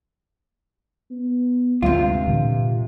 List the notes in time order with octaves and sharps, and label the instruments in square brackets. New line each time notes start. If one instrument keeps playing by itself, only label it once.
[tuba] B3
[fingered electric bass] D2 G3 G#3 [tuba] G2 [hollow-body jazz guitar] C3 F4
[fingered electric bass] A#2 D3 E3